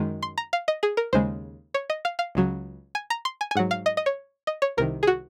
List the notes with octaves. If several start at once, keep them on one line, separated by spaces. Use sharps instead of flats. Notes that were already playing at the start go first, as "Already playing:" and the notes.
Already playing: F#2 D#3 G#3
C6
A#5
F5
D#5
G#4
A#4
D#2 C#3 G#3 C5
C#5
D#5
F5
F5
C#2 C#3 F#3
G#5
A#5
C6
G#5
G#5
G#2 F#3 F#5
F5
D#5
D#5
C#5
D#5
C#5
C2 C3 D#3 A#4
G#4
F#4